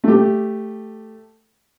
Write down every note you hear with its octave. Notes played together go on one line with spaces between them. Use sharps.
A3 G4